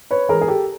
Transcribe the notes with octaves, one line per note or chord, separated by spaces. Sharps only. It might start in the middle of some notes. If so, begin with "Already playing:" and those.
B4 C#5
E3 G#3 G#4 A#4
G#4
G4 A4